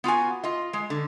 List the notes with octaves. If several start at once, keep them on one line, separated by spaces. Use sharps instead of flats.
B3 F4 F#4 G#5
F4 D#5
G#3
D3